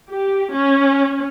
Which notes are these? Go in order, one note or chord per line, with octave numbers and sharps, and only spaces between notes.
G4
C#4